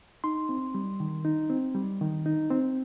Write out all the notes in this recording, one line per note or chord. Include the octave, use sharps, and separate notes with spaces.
D#4 C6
C4
G3
D#3
D#4
C4
G3
D#3
D#4
C4